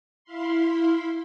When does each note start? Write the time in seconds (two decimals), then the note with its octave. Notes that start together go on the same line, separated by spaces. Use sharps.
0.24 E4 F5 B5 C6